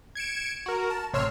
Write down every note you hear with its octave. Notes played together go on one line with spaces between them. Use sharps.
G#6 C#7 D7 E7
F#4 A#4
A5
A1 C3 C#5 C6 E6 F6